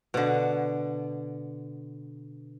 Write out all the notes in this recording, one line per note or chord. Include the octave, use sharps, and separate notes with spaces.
B2 D3